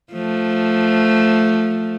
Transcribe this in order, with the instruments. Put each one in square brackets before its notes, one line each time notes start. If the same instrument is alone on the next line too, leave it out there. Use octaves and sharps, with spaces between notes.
[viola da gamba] F3 A3